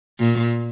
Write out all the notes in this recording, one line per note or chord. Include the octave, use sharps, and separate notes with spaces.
A#2